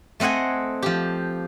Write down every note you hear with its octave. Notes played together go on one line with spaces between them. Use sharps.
A3 C4 D#5 F#5 G#5
F3 G4